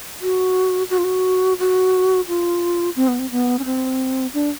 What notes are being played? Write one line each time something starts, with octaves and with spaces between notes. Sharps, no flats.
F#4
F#4
F4
F#4
F#4
F4
C4
B3
C4
B3
C#4
C4
D4